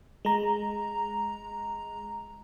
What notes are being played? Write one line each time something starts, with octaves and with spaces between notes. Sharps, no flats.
G#3 A#5